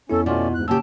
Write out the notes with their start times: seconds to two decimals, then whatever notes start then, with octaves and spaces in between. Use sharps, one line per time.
0.10 F2 B3 C#4 E4 A4
0.26 B2 A3 C#4 F4 D5
0.54 D2 G#2 F#6
0.68 A#2 C#3 A#3 C#4 G4 A5 E6